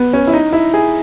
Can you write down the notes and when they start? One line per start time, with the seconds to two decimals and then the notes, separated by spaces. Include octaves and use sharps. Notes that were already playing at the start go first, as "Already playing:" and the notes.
Already playing: B3
0.13 C#4
0.27 E4
0.33 D#4
0.53 E4
0.74 G#4